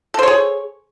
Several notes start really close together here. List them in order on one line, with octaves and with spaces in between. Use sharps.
A4 C5 C#5 G#4